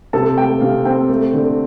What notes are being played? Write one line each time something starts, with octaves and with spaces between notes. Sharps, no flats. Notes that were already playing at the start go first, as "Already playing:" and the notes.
C3 A4 A5
A3 G5
C3 F5
C4 G5
A3
D3